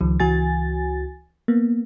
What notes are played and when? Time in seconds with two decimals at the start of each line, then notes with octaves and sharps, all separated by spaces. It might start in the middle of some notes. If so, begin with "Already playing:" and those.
0.01 C#2 D#3 F3
0.20 C#2 E3 F#4 G#5 A6
1.48 A#3 B3